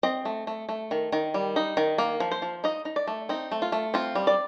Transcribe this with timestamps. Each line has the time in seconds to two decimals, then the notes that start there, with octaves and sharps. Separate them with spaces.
0.03 C4 D#5
0.25 A3
0.47 A3
0.69 A3
0.91 D#3
1.12 D#3
1.34 G3
1.56 D#4
1.77 D#3
1.98 A#3
2.20 F3
2.31 C5
2.42 F3
2.64 D#4 D#5
2.85 D#4
2.96 D5
3.07 A3
3.29 C4 D#4
3.52 A3
3.62 F4
3.72 A3
3.94 C4 F4
4.15 G3
4.27 D5